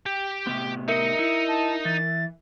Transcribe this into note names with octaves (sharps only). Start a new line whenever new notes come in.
G4
A2 C3 B3
D#4 A#4 D#5 E5 C#7
E4
A5
E3 A6